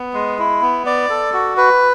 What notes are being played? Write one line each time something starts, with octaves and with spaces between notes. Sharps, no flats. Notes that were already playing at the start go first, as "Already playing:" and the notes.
Already playing: B3
G#3
E4
B3
D5
A4
F#4
B4